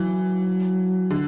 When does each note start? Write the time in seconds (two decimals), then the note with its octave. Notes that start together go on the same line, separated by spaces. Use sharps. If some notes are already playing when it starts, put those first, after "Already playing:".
Already playing: E3 F#3
1.10 D3